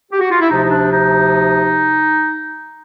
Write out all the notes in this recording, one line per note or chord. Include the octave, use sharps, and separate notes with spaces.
G4
F#4
F4
E4
D2 C3 F3 D#4
D4
D#4